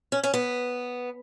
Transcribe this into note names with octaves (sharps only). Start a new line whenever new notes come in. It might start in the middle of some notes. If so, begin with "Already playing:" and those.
C#4
C#4
B3